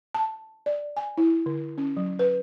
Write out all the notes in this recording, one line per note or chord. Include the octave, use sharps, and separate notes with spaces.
A5
D5
G#5
E4
D3
C#4
F#3
B4